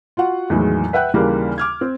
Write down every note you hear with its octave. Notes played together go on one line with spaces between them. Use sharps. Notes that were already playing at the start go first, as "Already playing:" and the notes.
F4 F#4 F#5
E2 A2 D#3 E3 F#3 G#3
B4 E5 F#5 G5 F#6
D#2 C#3 E3 G3 A#3
D6 F6 G#6
C4